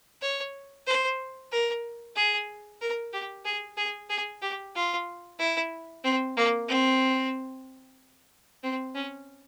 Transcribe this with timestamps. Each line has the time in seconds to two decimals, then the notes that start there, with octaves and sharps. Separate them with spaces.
0.22 C#5
0.87 C5
1.52 A#4
2.16 G#4
2.81 A#4
3.13 G4
3.45 G#4
3.77 G#4
4.09 G#4
4.42 G4
4.75 F4
5.39 E4
6.04 C4
6.37 A#3
6.68 C4
8.63 C4
8.95 C#4